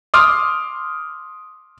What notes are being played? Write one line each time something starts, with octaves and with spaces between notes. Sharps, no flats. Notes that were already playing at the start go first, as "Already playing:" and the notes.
C6 D6 D#6 F6